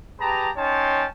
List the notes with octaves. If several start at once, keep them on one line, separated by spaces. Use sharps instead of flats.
G4 G#4 B4 A5 A#5
C#4 D#4 C#5 G5 A5 C6